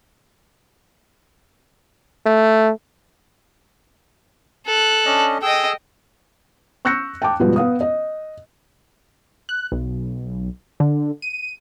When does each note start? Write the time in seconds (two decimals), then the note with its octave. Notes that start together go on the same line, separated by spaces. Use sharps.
2.26 A3
4.66 A4 F#6
5.06 C#4 D4 D#5
5.43 G#4 D#5 G5 E6
6.85 C#6 E6 F#6 G6 A#6 C#7
7.22 G5 A5 D6
7.39 G#2 B2 F3 G3 B3
7.56 B3 F5 D#6
7.81 D#5
9.49 F#6
9.72 B1
10.80 D3
11.22 D#7